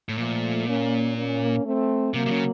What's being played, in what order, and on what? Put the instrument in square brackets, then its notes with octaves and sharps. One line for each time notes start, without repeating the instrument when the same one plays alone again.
[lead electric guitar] A2
[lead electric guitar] A#2 [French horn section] F3 A3
[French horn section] A#3 C#4
A#3 C#4
A3 C4
[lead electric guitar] C3 [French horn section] F#3 A#3
[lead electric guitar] C3
C#3